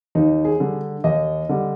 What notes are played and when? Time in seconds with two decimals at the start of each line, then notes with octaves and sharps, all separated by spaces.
0.15 D#2 D#4
0.45 G#4
0.60 D3 G3
1.04 D#2 D#5
1.49 D3 G3